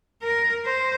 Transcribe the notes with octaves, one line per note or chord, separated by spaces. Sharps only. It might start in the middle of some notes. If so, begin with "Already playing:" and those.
A#4
C5